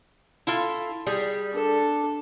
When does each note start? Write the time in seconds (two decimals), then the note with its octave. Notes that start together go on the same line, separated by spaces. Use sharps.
0.47 E4 F4 A4
1.07 G3 G#4
1.54 D4 A4